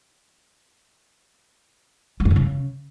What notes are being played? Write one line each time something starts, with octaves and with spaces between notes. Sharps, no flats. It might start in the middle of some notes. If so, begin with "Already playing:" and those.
F3
G2
D3
C#3